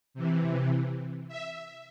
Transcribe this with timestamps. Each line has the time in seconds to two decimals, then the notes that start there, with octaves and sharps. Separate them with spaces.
0.14 C3 E3
1.28 E5